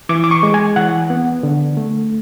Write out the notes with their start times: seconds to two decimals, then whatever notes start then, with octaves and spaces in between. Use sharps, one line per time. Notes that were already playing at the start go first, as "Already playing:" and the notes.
0.09 E3 D6
0.24 D6
0.31 C#6
0.43 G#3
0.54 G#5
0.76 E3 F#5
1.10 B3
1.43 D3
1.77 A3